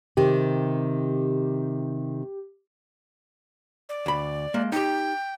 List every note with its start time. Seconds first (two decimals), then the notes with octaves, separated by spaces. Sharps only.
0.17 C3 D#3 G4
3.89 D5
4.06 D2 B5
4.54 G#3 A#3
4.72 D#4 G4 G5